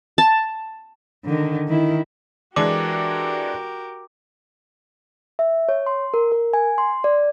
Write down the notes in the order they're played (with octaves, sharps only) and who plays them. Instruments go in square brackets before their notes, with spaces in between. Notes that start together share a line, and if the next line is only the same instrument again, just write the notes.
[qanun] A5
[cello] D3 D#3
D#3 E4
[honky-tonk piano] E3 G#3 D4 [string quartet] F#4 G4 A#4 [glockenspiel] D6
[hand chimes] E5
C#5
C6
A#4
A#4
G#5
C6
D5